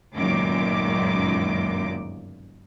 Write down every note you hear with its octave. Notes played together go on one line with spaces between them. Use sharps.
G1 C#2 F#2 A#2 D#3 D6